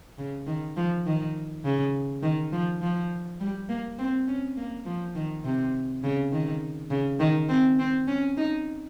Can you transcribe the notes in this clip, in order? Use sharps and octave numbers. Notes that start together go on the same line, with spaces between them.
C#3
D#3
F3
D#3
C#3
D#3
F3
F3
G3
A#3
C4
C#4
A#3
F3
D#3
C3
C#3
D#3
C#3
D#3
C4
C4
C#4
D#4